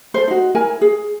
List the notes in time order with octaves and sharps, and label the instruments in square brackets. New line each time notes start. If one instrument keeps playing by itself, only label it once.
[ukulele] A4 C5
D#4 F#4
E4 A#4 G#5
G#4